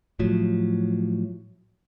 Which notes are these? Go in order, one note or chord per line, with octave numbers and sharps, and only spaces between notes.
A2 F3 F#3